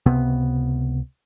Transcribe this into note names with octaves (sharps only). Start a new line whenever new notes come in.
C#2 C3 B3